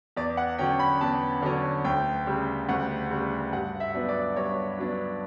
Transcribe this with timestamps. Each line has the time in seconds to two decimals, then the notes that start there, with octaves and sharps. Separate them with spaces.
0.16 E2 D5
0.37 F#5
0.58 D3 F#3 C#4 G5
0.79 B5
1.01 E2 A5
1.42 D3 F#3 C#4
1.85 D2 G5
2.27 C#3 G3
2.69 D2 F#5
3.10 C#3 G3
3.52 G2 F#5
3.80 E5
3.94 F#3 B3 D4
4.09 D5
4.36 G2 C#5
4.78 F#3 B3 D4